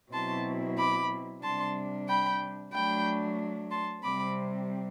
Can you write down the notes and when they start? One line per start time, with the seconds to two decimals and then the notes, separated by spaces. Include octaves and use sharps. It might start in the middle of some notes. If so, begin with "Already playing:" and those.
0.13 B2 F#3 C4 E4 A5 C6
0.78 B5 D6
1.43 C3 G3 D4 A5 C6
2.09 G5 B5
2.74 F#3 A3 D4 G5 B5
3.71 A5 C6
4.03 C3 G3 C4 B5 D6